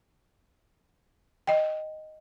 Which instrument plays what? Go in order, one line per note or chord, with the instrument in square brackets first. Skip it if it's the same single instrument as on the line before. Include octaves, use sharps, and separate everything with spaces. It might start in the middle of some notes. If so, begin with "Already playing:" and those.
[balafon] D#5 G5